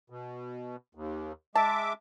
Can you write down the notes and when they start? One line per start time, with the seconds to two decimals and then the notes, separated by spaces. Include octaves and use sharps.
0.10 B2
0.95 D#2
1.55 G#3 E5 A5 D6